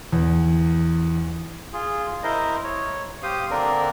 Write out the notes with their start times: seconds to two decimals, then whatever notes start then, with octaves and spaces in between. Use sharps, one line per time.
0.12 E2
1.73 F4 G#4
2.23 E4 A#4 C5 D#5
2.64 C#5
3.23 G4 C5 F5 D#6
3.50 D3 A#3 C4 D4 A#4